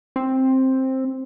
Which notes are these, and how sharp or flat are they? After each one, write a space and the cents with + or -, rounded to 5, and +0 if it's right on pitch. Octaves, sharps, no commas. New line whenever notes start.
C4 +10